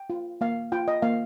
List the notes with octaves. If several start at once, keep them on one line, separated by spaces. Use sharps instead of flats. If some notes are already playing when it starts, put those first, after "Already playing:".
Already playing: G5
F4
A#3 F5
F4 G5
D#5
A#3 F5